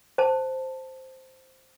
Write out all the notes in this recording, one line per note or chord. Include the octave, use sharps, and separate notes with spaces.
C5 A5